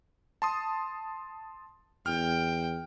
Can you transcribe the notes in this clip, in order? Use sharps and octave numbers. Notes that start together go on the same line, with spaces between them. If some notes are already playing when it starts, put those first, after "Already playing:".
A5 C6 D#6
E2 G5 F6